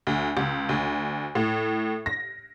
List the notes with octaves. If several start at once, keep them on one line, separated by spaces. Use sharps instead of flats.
D2
C#2
D2
A2
A#6